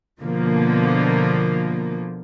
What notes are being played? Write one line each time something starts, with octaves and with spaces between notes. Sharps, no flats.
B2 D3 F3 A#3